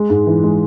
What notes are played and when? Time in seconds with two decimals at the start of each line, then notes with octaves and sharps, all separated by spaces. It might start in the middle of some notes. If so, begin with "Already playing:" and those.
Already playing: G#3
0.10 G#2
0.27 E3
0.44 G#3